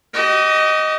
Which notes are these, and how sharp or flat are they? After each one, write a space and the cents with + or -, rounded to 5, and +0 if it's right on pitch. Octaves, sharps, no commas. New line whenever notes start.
G4 -45 D#5 +0